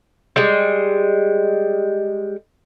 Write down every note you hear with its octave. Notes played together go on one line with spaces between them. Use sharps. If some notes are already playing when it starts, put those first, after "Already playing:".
G3 G#3